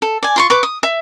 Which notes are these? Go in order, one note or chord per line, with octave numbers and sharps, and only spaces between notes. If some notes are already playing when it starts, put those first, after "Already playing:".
A4
D5 G#5
F4 C6 C#6
B4 C#6 D6
D#6
E5